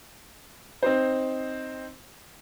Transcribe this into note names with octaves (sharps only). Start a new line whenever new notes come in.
C4 D#4 C5